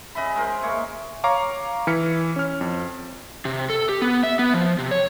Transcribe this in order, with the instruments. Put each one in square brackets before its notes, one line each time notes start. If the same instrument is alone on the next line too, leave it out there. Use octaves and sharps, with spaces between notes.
[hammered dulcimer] C#3 D#5 E5 B5
G#3 A#4 C5
G#3 A#3 C#5 E5
[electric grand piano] C#5 F5 A#5 C#6 D6
E3 E4 F6 B6 C#7
C#4 F6
F2
[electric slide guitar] C3
A4
G4
B3
E5
B3
F3
C3
C#5